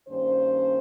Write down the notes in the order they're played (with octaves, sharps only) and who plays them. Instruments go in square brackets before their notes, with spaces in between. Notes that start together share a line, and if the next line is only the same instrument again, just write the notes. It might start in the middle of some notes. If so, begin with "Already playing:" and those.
[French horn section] G2 D#3 A#3 C#4 C5